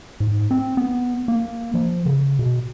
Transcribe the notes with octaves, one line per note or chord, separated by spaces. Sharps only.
G#2
C4
B3
A#3
F3
C#3
B2